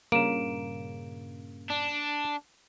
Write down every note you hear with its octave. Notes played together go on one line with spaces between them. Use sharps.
G2 A#2 C#3 A#3 D7 E7
D4